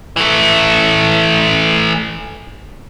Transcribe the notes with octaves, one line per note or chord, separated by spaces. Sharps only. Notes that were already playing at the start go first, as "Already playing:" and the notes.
E3 A3